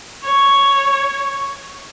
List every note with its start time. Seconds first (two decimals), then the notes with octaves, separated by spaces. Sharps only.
0.23 C#5